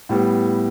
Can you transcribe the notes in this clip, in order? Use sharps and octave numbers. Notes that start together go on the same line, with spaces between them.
A2 G3 B3